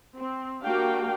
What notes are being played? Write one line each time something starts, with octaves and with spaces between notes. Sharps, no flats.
C4
A#3 D4 F#4 G4 F5 G5